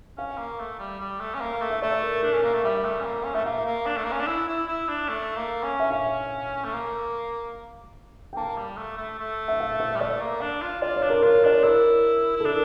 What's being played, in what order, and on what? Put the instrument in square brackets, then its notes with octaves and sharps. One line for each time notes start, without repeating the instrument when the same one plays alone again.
[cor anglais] C#4 [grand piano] F5
[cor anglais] A#3
A3
G3
G3
A3
C#4
A#3
A3
[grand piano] E5
[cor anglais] A3 [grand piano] D5
[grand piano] A#4
[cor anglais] D4 [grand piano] A#4
[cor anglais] C#4
A#3
A3
[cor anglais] G3 [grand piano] E5
[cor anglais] A3
C#4
A#3
C#4
[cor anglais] A3 [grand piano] E5
[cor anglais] A#3 [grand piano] F5
[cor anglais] A#3
D4
A3
A#3
C#4
D4
E4
E4
E4
D4
A3
A#3
C#4
[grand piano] E5
[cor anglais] C#4 [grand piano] F5
[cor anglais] A3
A#3
[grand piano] G5
[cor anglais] A#3 [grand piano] A5
[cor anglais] G3
A3
A3
A3
[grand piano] E5
F5
E5
[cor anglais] G3
[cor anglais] A3 [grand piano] D5
[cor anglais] A#3
D4
F4
[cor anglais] F4 [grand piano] D5
[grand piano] C#5
[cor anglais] D4
[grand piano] A#4
[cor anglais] F4 [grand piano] C#5
[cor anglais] D4 [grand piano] D5
[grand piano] C#5
[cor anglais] E4 [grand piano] A#4
[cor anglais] E4 [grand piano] A4
[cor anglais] D4 [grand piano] A#4